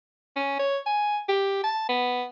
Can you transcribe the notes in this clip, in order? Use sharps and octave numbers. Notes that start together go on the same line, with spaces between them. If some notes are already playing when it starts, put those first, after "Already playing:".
C#4
C#5
G#5
G4
A5
B3